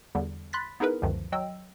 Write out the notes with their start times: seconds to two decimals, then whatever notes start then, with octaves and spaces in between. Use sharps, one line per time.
0.15 E2 D3 G3 B3
0.53 B5 C6 F#6 A6 B6
0.80 B3 D#4 E4 G#4 A#4 B4
1.02 C#2 F#2 D3 D#3 F3
1.32 F#3 D#5 G5 E6